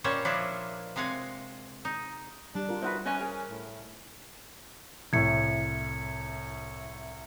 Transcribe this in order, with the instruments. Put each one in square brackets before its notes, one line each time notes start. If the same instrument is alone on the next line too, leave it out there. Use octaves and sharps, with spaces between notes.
[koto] A#2 G3 C#4 C5 C#5 F#5
F3 A#3 C#4 D4 E4
C3 G#3 F5 F#5 G#5
D#4
[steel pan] G3 [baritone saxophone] D4
[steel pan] F4 A#4
[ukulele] D#4 F#4 B4 [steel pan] C5 E5
[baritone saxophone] C#4 [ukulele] B4 D#5 G#5
[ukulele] G#4 A#4
[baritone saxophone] A2
[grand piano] C2 A2 [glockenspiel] G#6 C#7